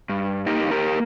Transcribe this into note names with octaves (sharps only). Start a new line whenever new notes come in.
G2
A#3 D#4 G4
G4 A#4